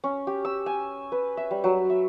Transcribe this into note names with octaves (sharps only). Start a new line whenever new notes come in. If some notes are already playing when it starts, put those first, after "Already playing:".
C#4
G4
E6
G#5
B4
E5
G3
F#3
E5